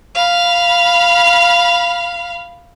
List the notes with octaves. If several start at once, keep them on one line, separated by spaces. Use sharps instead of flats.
F5 B5